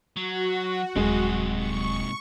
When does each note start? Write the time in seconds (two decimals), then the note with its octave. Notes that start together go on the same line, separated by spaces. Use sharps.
0.16 F#3 F#4
0.96 D#1 G#2 C3 F#3 G#3
1.55 C#6